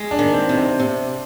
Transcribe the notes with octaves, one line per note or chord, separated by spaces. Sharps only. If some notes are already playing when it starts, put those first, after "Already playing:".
Already playing: G#3
D4
D#3
C4
C3
C4
C3